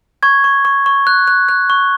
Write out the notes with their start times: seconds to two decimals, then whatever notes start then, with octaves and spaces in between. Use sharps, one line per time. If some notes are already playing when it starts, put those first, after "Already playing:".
0.23 C#6 G#6
0.44 C#6
0.65 C#6
0.86 C#6
1.07 F#6
1.28 F#6
1.49 F#6
1.70 C#6